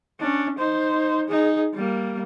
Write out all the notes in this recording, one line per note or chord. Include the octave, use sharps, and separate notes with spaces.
C#4 D4
D#4 C5
D#4 G#4
G3 A#3